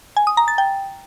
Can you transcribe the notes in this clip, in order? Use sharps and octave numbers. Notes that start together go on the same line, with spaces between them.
G#5
D#6
A#5
A6
G5